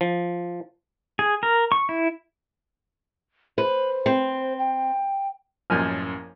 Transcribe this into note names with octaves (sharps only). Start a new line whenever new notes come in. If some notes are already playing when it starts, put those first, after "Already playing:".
F3
G#4
A#4
C#6
E4
B4 C5
C4
G5
A1 F#2 F3 A#3 D#5 G#5 F6 G6